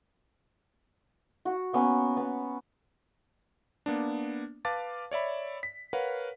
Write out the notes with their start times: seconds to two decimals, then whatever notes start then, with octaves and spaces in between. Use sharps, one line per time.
1.45 F#4 F#5
1.73 A#3 B3 C#4
2.17 B3
3.86 A#3 B3 D4
4.65 B4 F5 A5 D6 A6
5.11 C#5 D5 E5 B5
5.63 B6
5.93 A#4 B4 C#5 F5 F#5